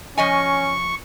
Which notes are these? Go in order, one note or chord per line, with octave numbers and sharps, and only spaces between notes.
F3 C#4 D#5 G#5 C#6